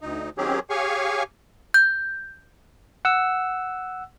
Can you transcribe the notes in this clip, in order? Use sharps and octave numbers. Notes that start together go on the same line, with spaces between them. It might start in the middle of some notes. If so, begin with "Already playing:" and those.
D2 D#4
D#3 F#3 C4 C#4 G4 G#4
G4 G#4 C#5 F5 G#5 C#6
G6
F#5 E6